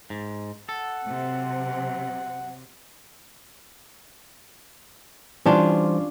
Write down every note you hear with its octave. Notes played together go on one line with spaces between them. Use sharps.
G#2
A4 F#5
C3 F#3 C4
E3 G3 C#4 D4 F4 C5